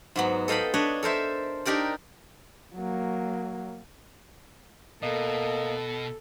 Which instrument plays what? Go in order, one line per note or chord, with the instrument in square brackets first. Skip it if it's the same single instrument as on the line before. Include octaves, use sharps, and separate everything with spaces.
[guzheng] G#2 F#3 B3
A4 D#5 F5 G5 B5
D4 B4 C#5 D#5
A4 A#4 C5 E5
D4 D#4 G4 A#4 D5
[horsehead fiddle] F#3 A#3
[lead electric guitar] B2 [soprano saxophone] A#3 [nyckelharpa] A4 [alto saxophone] D#5